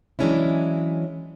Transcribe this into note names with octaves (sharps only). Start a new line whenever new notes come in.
E3 F#3 G#3 C#4 D4 E4